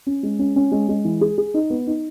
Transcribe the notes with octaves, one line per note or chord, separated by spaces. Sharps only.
C#4
G#3
C#4
C#4
G#3
G#3
E3
G#4
G#4
D#4
B3
D#4